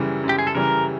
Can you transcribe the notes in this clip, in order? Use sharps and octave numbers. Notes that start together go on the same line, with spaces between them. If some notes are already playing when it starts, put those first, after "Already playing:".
Already playing: F#2 C#3 E3 G3
F#2
G4
G#4
A4
C#3 E3 G3 A#4